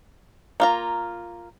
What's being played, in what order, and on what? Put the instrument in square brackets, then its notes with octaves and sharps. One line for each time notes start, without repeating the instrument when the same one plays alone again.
[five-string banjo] A#3 F4 A#5